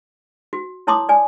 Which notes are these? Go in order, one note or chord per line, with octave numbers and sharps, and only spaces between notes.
F#4
E4 C#5 A5 C6 D6 D#6
D5 G#5